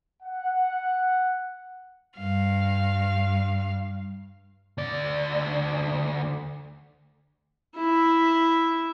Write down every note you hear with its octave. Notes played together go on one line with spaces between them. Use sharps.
F#5
G2 F5
D2 D5
E4 E5